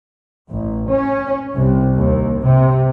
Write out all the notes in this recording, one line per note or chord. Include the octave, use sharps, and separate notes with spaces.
A1
C#4
C2
D#2
C3